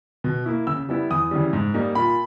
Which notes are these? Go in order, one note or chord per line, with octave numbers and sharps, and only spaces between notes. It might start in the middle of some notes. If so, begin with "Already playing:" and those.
B2
A#3 E4
C#3 E6
G3 B3 E4
E2 D#6
C#3 E3 G3
G#2
G3 A#3 D#4
A#2 B5